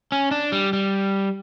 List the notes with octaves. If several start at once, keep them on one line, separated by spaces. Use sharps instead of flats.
C#4
D4
G3
G3